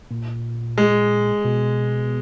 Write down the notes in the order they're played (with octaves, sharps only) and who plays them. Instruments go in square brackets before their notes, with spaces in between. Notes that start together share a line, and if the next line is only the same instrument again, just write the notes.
[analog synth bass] A#2
[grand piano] G#3
[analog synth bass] B2